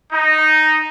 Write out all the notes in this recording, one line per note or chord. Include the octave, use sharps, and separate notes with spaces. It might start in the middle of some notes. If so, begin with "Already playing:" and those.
D#4